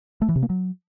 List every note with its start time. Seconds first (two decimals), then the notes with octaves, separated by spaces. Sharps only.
0.22 A3
0.29 E3
0.36 C3
0.43 A#3
0.50 F#3